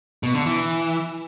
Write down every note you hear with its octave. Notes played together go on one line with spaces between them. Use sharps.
B2
D3
E3